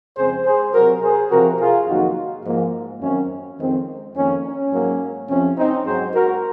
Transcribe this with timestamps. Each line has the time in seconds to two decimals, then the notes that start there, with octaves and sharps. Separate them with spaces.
0.16 F2 C#3 G#3 C4 G#4 C5
0.44 G#4 C5
0.73 C3 F#3 C4 F#4 A#4
1.02 G#4 C5
1.30 C3 F3 C4 F#4 A#4
1.59 F4 G#4
1.87 F2 D#3 F#3 A#3 D#4 F#4
2.44 G#2 F3 A#3
3.00 F#2 D#3 F#3 C4 C#4
3.58 F2 D#3 G#3 C4
4.15 F2 D#3 A#3 C#4
4.44 C#4
4.72 G#2 F#3 A#3
5.28 F2 C3 F3 C4 C#4
5.57 C4 D#4
5.85 G#2 F#3 C4 G#4 C5
6.14 F#4 A#4